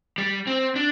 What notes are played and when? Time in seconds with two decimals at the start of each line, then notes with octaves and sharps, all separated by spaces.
0.18 G3
0.47 C4
0.76 D4